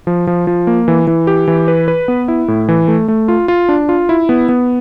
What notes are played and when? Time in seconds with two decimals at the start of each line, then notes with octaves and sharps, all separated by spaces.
0.07 F3
0.27 F3
0.47 F3
0.67 A#3
0.88 E3
1.07 E3
1.27 G4
1.48 E3
1.68 B4
1.88 B4
2.08 B3
2.28 E4
2.48 A2
2.69 E3
2.88 A3
3.08 A3
3.28 F4
3.48 F4
3.69 D4
3.89 F4
4.09 E4
4.29 B3
4.49 B3